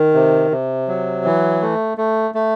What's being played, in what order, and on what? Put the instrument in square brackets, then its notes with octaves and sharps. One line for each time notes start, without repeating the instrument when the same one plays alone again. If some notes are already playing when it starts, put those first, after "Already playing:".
Already playing: [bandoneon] D#3
C3
C3
F#3
E3
A3
A3
A3